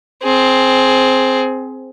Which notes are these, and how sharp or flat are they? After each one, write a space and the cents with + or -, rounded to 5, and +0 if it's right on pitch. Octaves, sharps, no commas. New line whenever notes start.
C4 +0 G#4 +20